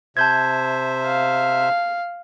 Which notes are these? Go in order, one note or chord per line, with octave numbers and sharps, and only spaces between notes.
C3 C5 E5 A5 G6 G#6
F5